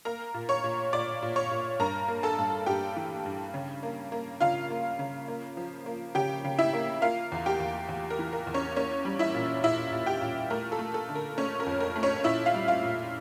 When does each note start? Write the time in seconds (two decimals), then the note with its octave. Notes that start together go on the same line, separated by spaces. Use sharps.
0.05 A#3 A#4 A#5
0.34 A#2
0.49 C#5 C#6
0.64 A#2
0.93 A#2 D5 D6
1.23 A#2
1.36 C#5 C#6
1.51 A#2
1.79 G2 A#4 A#5
2.08 A#3
2.23 A4 A5
2.38 G2
2.66 G2 G4 G5
2.96 E3
3.26 G2
3.54 C#3
3.83 A#3
4.12 A#3
4.41 C#3 F4 F5
4.70 A#3
4.99 C#3
5.28 A#3
5.57 F3
5.86 A#3
6.15 C#3 G4 G5
6.45 C#3
6.59 E4 E5
6.73 A#3
7.02 A#3 F4 F5
7.32 E2
7.46 G4 G5
7.60 E2
7.89 E2
8.10 A#4
8.19 E3
8.33 A#4
8.47 E2
8.54 C#4 C#5
8.76 A#3 C#4 C#5
9.05 G3
9.19 E4 E5
9.34 A#2
9.63 A#2 E4 E5
9.92 A#2
10.06 G4 G5
10.21 A#2
10.50 A3 A#4
10.72 A4
10.79 A3
10.94 A4
11.09 D3
11.16 A#4
11.38 A3 C#4 C#5
11.60 A#4
11.66 F2
11.80 A#4
11.96 A3
12.03 C#4 C#5
12.24 A#2 E4 E5
12.46 F4 F5
12.54 G3
12.68 F4 F5
12.83 A#2